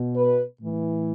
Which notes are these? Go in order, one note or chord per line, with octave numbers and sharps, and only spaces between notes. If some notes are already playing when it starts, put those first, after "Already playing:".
Already playing: B2
B4
A2 E3